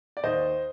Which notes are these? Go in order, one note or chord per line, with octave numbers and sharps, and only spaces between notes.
D5
D#2 C5 D#5